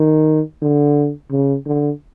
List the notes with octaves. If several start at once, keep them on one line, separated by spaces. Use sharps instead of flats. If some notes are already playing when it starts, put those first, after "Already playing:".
Already playing: D#3
D3
C#3
D3